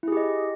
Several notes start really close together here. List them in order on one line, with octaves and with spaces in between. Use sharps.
E4 G#4 G4 D#5